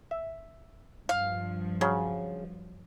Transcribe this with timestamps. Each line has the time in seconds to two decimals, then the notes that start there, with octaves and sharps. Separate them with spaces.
0.11 E5
1.09 G2 F3 F5
1.81 C#3 F#3